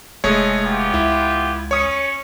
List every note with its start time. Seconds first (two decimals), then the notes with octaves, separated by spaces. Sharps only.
0.24 F1 G#3 A3 G#4 C#5 D#5
0.64 B3 F4 G4
0.94 C#2 E4
1.71 C#4 C#5 C#6 D#6